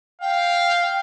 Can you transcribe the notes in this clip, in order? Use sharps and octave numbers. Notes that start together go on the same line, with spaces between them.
F5 G5